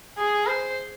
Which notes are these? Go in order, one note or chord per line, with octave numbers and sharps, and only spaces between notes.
G#4
C5